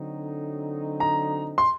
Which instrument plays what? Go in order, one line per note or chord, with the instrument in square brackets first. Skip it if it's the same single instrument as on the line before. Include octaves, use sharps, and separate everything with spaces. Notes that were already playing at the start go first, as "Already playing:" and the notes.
Already playing: [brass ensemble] D3 F#3 C4 D#4
[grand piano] A#5
C6